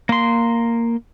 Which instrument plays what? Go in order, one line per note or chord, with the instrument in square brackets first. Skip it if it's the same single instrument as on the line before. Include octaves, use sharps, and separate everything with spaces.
[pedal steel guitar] A#3 C6